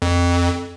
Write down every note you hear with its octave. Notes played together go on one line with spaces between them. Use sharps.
F2